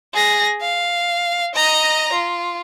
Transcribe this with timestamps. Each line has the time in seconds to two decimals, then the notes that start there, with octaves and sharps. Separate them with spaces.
0.14 G#4 A#6
0.62 F5
1.55 D#5 A#5
2.13 F4